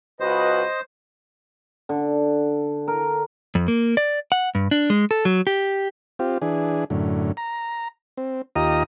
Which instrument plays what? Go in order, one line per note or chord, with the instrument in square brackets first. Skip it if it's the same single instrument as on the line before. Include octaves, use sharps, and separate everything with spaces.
[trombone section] C#2 F#4 B4 [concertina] C5 [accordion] D#5
[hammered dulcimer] D3
A#4
[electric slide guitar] F2
A#3
D5
F#5
G2
D4
G#3
A4
F#3
G4
[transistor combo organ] C4 F4 G4
E3 D4 G#4
F#2 A2 D3
A#5
C4
D#2 F4 G4 D#5 A#5 D#6